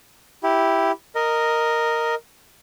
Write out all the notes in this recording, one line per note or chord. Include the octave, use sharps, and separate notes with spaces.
E4 G4
A#4 D#5